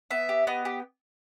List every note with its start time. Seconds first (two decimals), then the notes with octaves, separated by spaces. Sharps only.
0.11 B3 E5
0.29 G4
0.47 B3 D#5
0.65 G4